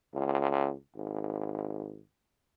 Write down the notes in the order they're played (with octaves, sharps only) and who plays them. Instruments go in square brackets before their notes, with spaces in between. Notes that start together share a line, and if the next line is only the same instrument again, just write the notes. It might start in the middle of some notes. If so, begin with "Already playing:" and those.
[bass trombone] C#2
G#1